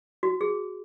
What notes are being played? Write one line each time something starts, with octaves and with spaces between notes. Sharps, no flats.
F#4
G#4